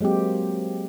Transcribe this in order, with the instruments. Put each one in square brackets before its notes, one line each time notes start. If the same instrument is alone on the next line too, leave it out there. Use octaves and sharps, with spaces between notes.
[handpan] F#3 G#3 A#3 C4 G4